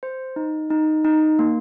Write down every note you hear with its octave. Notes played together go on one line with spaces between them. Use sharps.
C5
D#4
D#4
D#4
A#3